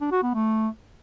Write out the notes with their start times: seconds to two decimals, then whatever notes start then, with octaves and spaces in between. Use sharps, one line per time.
0.01 D4
0.12 F#4
0.23 B3
0.34 A3